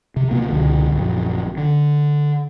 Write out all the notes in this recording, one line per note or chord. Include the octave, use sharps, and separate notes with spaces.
C3
B2 A#3
C#2 B2 D3
A#1 F#2
D3